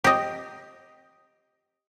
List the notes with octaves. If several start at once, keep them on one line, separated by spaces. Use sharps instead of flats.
G4 D#5